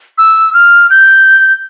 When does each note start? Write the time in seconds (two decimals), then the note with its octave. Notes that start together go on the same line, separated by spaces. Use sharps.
0.18 E6
0.54 F6
0.90 G6